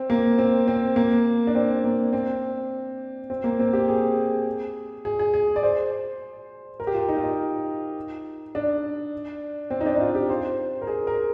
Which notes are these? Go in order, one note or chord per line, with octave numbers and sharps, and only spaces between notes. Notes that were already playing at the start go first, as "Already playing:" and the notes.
Already playing: C4
A#3
C4
C4
A#3
D4
C4
A#3
C4
C4
A#3
C4
G4
G#4
G#4
G#4
G#4
D5
C5
A#4
G4
F4
D#4
F4
D#4
D4
C4
D#4
D4
D#4
F4
G4
C5
A#4
G#4
A#4